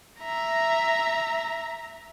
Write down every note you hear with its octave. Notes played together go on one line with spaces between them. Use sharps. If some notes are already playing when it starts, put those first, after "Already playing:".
E5 A#5